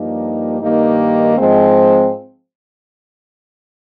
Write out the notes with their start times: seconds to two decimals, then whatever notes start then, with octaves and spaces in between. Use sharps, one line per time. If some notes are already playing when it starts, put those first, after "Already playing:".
Already playing: G2 F3 A#3 D#4 G4
0.62 G2 D#3 A#3 D#4 G4
1.37 G#2 F3 G#3 C4